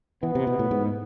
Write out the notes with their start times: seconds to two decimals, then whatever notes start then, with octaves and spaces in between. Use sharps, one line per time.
0.23 E3 B3
0.35 C3
0.47 B2
0.59 A2
0.71 G#2